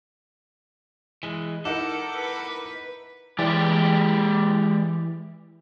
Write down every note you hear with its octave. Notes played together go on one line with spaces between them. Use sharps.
E3 G#3
D#4 E4 A4 A#4 F#5 D6
B4
E3 G#3 G4 D5